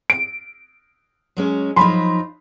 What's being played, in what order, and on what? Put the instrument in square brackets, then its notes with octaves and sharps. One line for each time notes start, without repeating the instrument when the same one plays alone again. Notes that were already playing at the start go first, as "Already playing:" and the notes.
[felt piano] D7
[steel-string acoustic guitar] F#3 G#3 C#4
[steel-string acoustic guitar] F3 F#3 D#4 [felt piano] B5 C6